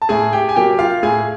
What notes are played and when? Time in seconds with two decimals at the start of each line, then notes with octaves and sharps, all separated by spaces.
0.02 A5
0.09 A2 G#4 G#5
0.33 G4 G5
0.49 G#5
0.55 F#3 A#3 G4 G5
0.79 F4 F5
1.03 A2 G#4 G#5